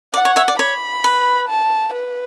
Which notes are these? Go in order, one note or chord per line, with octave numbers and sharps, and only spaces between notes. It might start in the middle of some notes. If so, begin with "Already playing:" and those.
D5 F#5
C#5
C#5 E5
D5
C#5 B5
B4
A5
B4